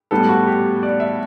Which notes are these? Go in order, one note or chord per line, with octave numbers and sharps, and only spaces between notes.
A2 G3 B3 A4
F#4
G4
D5
E5